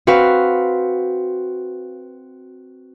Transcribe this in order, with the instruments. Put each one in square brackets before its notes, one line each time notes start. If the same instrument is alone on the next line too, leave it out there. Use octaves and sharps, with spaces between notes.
[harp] C4 F#4 B4 F5